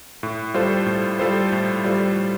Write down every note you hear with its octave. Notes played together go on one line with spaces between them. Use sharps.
A2
G3 F4 A4 C5
A2
G3 F4 A4 C5
A2
G3 F4 A4 C5
A2